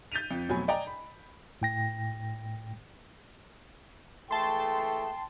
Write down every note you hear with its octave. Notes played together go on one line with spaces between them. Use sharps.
G6 A6 B6 D#7 F7
F2
F2 B2 F#3 A3 G#5 B5
D5 D#5 G5 G#5 A#5
B5
A2 G5 A#6
E3 G#3 A3 G5 A5 C6